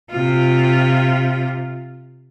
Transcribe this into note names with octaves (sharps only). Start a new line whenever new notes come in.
C3 F4